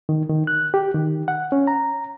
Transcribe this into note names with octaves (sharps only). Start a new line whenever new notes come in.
D#3
D#3
F#6
G4
D#3
F#5
C#4
A#5